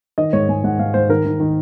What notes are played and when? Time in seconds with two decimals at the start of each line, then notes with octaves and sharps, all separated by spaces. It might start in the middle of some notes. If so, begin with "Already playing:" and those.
0.18 D#3 D#5
0.33 G#2 C#5
0.49 G#2 G#5
0.64 G#2 F#5
0.79 G#2 F5
0.94 G#2 C5
1.09 D#3 A#4
1.26 D#3
1.40 D#3